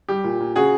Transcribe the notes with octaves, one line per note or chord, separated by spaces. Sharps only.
G3 G4
A#2
A#2
C#3 F#4 G#4